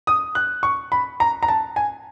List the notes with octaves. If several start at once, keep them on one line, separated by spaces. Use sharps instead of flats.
D#6
F#6
C#6
B5
A#5
A#5
A5
G#5